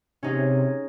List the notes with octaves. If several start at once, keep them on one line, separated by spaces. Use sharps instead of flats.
C3 C#4 D#4 G#4